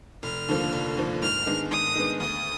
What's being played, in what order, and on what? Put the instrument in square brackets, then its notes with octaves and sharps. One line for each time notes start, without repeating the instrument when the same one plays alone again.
[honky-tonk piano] F1 [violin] F6
[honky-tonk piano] D#2 D3 F3 A#3
F1
D#2 D3 F3 A#3
[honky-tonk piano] G#2 [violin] F6
[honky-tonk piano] D#3 G#3 B3 D4
[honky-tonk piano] G#2 [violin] D#6
[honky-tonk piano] D#3 G#3 B3 D4
[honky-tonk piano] D2 [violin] D#6